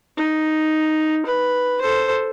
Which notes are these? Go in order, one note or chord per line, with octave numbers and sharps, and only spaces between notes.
D#4
B4
A4 C5